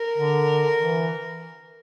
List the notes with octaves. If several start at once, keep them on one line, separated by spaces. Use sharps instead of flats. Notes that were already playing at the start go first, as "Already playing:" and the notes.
Already playing: A#4
D3
E3